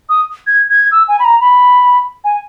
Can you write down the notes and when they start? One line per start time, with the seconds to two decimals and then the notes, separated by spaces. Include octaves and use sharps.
0.09 D#6
0.47 G#6
0.70 G#6
0.92 E6
1.08 G#5
1.19 B5
1.25 A#5
1.41 B5
2.24 G#5